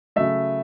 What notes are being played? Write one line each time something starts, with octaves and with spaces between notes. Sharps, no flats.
C#3 F#3 A3 E5